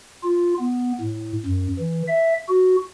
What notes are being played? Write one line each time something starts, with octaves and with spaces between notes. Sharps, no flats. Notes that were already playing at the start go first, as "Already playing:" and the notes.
F4
B3
A2
F#2
E3
E5
F#4